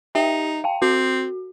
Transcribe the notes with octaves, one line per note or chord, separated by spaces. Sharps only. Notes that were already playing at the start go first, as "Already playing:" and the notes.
D#4 G4 E5 G5
F5 G5 A5
C4 F#4